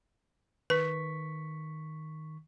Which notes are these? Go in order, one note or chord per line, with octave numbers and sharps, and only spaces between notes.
D#3 B4 C#6 B6